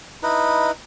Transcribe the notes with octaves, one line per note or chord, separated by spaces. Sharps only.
D#4 E4 B4 D#5